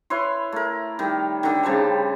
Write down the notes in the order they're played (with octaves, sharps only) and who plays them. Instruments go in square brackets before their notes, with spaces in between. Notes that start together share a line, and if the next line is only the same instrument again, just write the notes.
[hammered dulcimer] E4 B4 C#5 C6
A3 A#4
D#3 G3
D3 D#3
C#3 G3 C5 A5